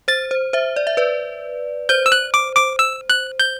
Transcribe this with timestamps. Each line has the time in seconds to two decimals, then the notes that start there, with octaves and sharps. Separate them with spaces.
0.08 C5 A6
0.31 C5
0.53 C5 E5
0.76 D5
0.87 E5
0.97 B4 D5
1.89 C5 G6
2.06 E6
2.12 F#6
2.34 D6
2.56 D6
2.79 E6
3.10 F#6
3.40 G6